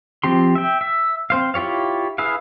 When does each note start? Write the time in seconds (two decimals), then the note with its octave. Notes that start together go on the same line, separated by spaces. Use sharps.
0.24 F3 C4 G4 C6
0.55 E5 G5
0.81 E5
1.30 C4 C5 F5
1.54 E4 F4 G4 C#5 F5
2.18 E4 G#4 B4 E5 F5